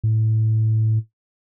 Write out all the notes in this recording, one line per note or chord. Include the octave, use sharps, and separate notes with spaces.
A2